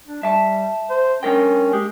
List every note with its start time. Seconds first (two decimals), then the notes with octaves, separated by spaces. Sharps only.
0.08 D4
0.23 G3 E5 A5
0.90 C5
1.23 G2 C#4 A#4 G5
1.73 G#3 G4